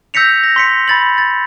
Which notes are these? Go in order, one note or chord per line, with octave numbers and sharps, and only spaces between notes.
E6 G6 A#6 B6 C#7 F7
A#6
C6 B6 C#7
B5 A6 F#7
A6